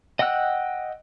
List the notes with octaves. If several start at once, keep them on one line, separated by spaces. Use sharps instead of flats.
D#5 F#5 G5 E6 F#6